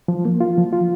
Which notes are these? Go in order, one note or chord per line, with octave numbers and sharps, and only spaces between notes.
F3
A#3
F4
F3
F4